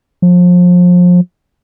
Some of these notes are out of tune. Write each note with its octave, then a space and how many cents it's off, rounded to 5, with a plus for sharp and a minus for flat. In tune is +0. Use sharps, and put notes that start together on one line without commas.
F3 +30